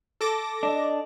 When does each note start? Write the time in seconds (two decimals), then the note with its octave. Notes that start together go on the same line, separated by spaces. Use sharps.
0.21 A4 D6 A#6
0.63 D4 D#5